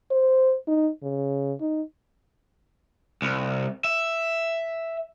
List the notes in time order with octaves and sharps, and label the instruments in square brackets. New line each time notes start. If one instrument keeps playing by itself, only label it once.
[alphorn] C5
D#4
C#3
D#4
[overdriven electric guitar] C2
E5